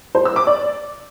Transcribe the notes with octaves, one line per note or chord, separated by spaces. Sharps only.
C5
E6
D6
D5